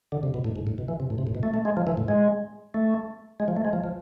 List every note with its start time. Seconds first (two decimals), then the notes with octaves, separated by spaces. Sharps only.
0.12 D3
0.23 C3
0.34 B2
0.44 A2
0.56 G#2
0.67 A2
0.78 B2
0.88 E3
1.00 C3
1.10 A2
1.18 C3
1.27 A2
1.35 B2
1.43 A3
1.54 A3
1.65 G#3
1.77 F3
1.87 E3
1.97 A2
2.08 G#3
2.74 A3
3.40 G#3
3.48 F3
3.56 A3
3.65 G#3
3.73 F3
3.84 F3